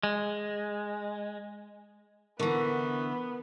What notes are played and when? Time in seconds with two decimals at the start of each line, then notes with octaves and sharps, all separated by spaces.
0.03 G#3
2.39 D3 E3 B3 A#4 C#6